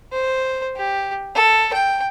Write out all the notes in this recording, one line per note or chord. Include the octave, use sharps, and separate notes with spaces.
C5
G4
A4
G5